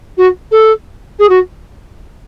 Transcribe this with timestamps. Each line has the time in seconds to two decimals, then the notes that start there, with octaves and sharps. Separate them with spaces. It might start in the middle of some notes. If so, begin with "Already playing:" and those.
0.17 F#4
0.51 A4
1.19 G#4
1.29 F#4